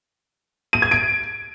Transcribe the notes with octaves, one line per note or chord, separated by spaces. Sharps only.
D#7
G#6
D7